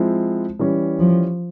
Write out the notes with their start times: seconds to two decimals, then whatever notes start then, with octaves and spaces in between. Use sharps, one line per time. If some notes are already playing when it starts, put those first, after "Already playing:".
Already playing: F3 G#3 C4 E4
0.59 E3 G3 C#4
0.99 F3